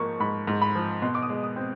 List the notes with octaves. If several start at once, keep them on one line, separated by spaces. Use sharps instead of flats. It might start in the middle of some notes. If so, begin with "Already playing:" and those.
Already playing: G#2 F3 A#3 C#6
G#2 B5
G#2
B5
F3
B2 C6
D6
D#6
G#3
D#6
C4